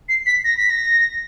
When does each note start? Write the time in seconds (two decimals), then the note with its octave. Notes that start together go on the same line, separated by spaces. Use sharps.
0.09 C7
0.26 B6
0.44 A#6
0.57 B6
0.70 A#6